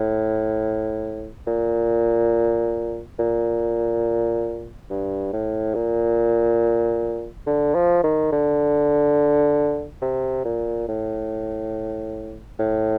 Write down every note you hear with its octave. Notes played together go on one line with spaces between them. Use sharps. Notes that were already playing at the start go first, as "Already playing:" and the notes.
Already playing: A2
A#2
A#2
G2
A2
A#2
D3
F3
D#3
D3
C3
A#2
A2
A2